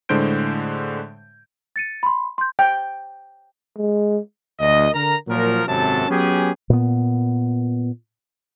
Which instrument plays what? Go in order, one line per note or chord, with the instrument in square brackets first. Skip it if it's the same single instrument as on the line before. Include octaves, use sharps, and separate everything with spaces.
[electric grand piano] A2 D3 G#3 C5 G6 D7
[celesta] A6 C#7 D#7
B5 C6
C6 G6
[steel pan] G5
[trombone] G#3
[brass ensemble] D2 D#5
D3 A#4 A#5
A#2 F3 F#3 A#4
G#1 F#2 C3 F#3 A4 A5
F#3 B3 C#4 G4 G#4
[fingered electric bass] A#2 B3